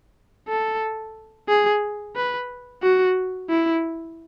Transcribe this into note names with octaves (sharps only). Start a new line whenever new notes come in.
A4
G#4
B4
F#4
E4